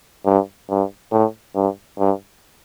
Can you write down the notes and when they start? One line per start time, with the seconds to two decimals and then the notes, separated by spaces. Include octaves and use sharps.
0.25 G2
0.69 G2
1.11 A2
1.55 G2
1.98 G2